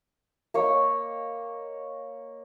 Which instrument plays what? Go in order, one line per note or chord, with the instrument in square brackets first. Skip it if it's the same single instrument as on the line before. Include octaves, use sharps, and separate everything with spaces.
[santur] A#3 C#5 D#5